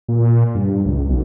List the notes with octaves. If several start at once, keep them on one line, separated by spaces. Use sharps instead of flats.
A#2
G2
C#2
B1